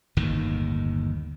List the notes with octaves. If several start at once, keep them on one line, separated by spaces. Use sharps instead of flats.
G1 D#2 A2 D#3